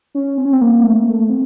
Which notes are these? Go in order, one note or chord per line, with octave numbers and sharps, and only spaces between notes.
C#4
C4
C#4
C4
A#3
A3
A#3
A3
C4